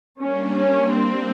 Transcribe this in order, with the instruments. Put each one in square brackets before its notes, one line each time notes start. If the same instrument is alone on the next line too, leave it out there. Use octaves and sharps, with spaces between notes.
[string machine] G3 A#3 D4 [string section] C#4
[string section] C#4
C4